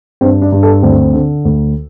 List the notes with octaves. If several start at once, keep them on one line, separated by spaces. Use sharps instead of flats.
G2 C4
D4
G2
A4
D2 C4
D3
D2